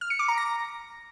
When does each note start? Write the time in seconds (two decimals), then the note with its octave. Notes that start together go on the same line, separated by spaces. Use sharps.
0.01 F6
0.10 C#7
0.19 D6
0.28 A#5
0.37 A#6